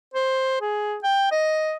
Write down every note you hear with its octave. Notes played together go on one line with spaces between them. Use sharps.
C5
G#4
G5
D#5